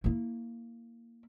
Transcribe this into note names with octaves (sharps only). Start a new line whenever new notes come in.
A#3 E4